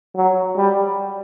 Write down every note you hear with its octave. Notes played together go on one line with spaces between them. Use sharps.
F#3
G3